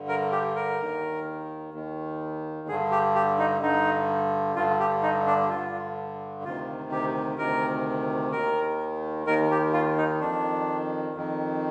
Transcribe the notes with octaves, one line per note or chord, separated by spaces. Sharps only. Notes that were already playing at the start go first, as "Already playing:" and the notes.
Already playing: G2 D3
A#4
G4
A#4
D#2 D#3
D#2 D#3
G2 D3 G#4
G4
G4
D#4
G2 D3 D#4
G2 D3 F4
G4
D#4
D4
G2 D3 F4
D2 C3 D#3 F4
G4
D2 C3 D#3 A#4
D#2 D#3 A#4
D#2 D#3 A#4
G4
F4
D#4
F2 D#3 D4
F2 D#3